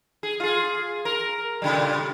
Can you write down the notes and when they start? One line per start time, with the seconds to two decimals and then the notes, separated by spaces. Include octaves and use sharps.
0.23 G#4
0.40 F4 G#4
1.05 A#4
1.62 A#2 C#3 G3